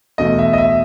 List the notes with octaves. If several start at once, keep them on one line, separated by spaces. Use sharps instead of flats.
E2 B2 A3 D#5
E5
D#5
E5